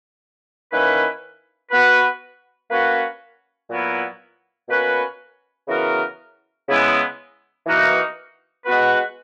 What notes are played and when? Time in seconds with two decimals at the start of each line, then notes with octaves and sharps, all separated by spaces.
0.72 D#3 A#3 C#4 E4 B4
1.71 B3 F#4 B4
2.70 A#3 C#4 F#4 B4
3.69 A#2 F#3 B3 E4 A#4
4.69 B2 A#3 C#4 F#4 B4
5.68 C#3 E3 B3 F#4 A#4
6.68 C#3 G#3 B3 E4
7.66 E3 A#3 D#4 F#4
8.66 G#3 B3 F#4 B4